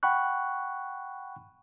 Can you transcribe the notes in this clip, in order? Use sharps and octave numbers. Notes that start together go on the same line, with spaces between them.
F#5 G5 B5 C#6 F#6